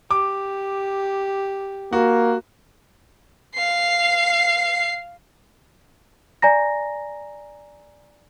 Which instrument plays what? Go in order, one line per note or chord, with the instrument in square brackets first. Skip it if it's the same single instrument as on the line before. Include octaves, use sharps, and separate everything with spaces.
[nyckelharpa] G4 [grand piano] D6
[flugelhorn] A#3 [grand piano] F#4
[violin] F5 C7
[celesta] D5 G#5 A#5 A#6